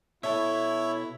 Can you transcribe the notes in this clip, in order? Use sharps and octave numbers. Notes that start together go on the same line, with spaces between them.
B2 E4 A4 C#5 E5